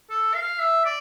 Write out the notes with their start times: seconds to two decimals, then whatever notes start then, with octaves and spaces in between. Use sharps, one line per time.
0.10 A4
0.34 F5
0.59 E5
0.85 D5